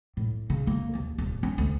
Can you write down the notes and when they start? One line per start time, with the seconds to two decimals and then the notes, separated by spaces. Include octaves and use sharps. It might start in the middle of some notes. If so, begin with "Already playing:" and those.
0.17 A2
0.50 C#3
0.67 A#3
0.95 D#2
1.18 D#1
1.43 C#4
1.58 D2